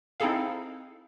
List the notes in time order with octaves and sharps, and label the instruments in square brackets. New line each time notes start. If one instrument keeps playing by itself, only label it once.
[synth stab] C4 D#4 E4 G#4 A4 F5